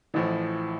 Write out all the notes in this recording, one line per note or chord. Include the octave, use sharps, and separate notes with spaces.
A1 A2 E3 F3 E4